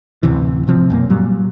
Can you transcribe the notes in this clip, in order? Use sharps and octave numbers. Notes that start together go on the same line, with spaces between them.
A1 D2 C3 E3
G#1 C3 F3 C4
B1 F#2 A#3
A#2 F#3 G3